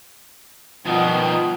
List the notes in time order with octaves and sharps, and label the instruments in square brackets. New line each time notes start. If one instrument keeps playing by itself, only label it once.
[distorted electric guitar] G2 D#3 [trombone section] B2 [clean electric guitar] F3 [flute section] G5 D#6